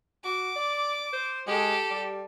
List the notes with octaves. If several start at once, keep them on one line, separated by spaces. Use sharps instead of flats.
F#4 D6
D5
C5
G#3 G4 A4
G3